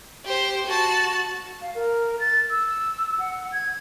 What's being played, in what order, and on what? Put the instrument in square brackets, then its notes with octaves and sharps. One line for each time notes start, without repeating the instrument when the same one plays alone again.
[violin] G4 C5
F#4 A5
[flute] F5
A#4
A6
E6
F#5
G#6